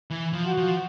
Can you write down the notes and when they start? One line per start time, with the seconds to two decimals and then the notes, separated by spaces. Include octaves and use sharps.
0.10 E3
0.33 F3
0.46 F#4
0.58 F3